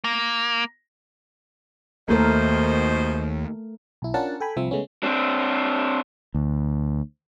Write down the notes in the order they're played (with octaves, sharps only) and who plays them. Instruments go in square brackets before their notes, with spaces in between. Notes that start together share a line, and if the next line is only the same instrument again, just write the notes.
[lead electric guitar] A#3
[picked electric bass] D#2 A#3 [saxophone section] B2 D#3 C5 [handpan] A3 A4 A#4
[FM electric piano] B1 E4
C#4 D4 F4 A#4 F#5 A5
A4 G5 G#5 B5
C2 F3 C4 E5
C#3 G#3 A3 B3 C#4
[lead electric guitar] C4 D4
[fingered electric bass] D2